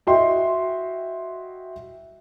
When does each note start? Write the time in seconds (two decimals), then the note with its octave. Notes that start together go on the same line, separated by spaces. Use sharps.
0.07 E4 F#4 D#5 E5 G5 C6